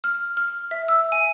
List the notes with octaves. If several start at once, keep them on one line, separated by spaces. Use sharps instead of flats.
F6
F6
E5
E6
G#5